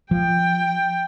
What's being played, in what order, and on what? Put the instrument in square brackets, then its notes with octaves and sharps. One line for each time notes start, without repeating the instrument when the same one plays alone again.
[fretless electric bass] F3 [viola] G5